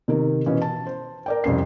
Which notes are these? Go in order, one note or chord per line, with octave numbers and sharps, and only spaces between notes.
C3 D#3 A#4
B2 E3 C#4
A5
C5
A#4 D5 G5
C2 F2 C#4 C7